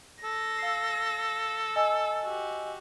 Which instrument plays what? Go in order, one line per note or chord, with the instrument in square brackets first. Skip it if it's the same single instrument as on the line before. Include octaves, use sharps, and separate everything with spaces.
[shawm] A4 [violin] A#6
[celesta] F5 E6 C7
D#5 G#5 E6
[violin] F#4 G4